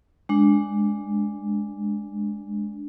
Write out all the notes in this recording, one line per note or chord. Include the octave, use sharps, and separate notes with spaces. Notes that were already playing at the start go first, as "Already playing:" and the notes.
G#3 D4